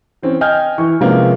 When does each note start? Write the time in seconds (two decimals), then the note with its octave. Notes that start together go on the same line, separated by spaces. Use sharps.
0.22 E3 C4 C#4
0.41 D#5 G5 G#5 F6 G6
0.78 E3 E4 C#6
1.00 C3 F3 G#3 A#3 B3 C#4